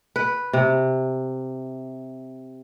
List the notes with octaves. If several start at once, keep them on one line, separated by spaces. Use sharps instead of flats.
B4
C3